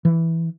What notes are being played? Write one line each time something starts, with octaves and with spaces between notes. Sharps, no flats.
E3